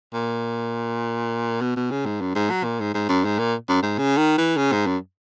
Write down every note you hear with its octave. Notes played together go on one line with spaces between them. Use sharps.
A#2
B2
B2
C#3
G#2
F#2
G#2
F#3
A#2
G#2
G#2
F#2
G#2
A#2
F#2
G#2
C#3
D#3
E3
C#3
G#2
F#2